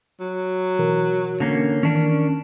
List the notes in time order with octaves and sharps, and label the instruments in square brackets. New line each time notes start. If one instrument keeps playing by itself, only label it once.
[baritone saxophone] F#3
[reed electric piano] B2 E3 A#4
[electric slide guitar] D3 A#3 C#4
[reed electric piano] D#3 E3 [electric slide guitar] C#4 D4 A#4